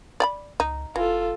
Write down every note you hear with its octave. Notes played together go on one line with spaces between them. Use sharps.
D5 G5 B5
C#2 D#4
F1 E3 F4 A4